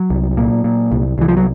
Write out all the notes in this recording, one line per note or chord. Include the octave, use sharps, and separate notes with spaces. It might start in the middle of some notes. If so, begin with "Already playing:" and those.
Already playing: F#3
C2
A#2
A#2
C2
C2 E3
F3
F#3